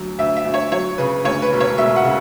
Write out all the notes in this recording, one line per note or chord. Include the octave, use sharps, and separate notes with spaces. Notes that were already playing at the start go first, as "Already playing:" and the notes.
Already playing: D2 F#3
D2 E5
E5
D2
C#5
F#3 C#5
C#3 B4
D2 C#5
B4
E1
C#5
E1 E5
F#5
C#3